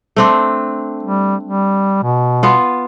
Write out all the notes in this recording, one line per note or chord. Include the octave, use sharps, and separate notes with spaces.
A3 C4 D4
G3
G3
B2
B3 F4